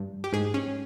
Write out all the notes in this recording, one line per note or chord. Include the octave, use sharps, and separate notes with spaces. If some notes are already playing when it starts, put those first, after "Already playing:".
Already playing: G2
G4
G#2 G#4
C#4